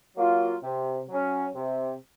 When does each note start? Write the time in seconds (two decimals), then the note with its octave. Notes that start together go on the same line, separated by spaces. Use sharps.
0.16 F#3 A#3 F4
0.63 C3
1.09 F#3 C#4
1.55 C3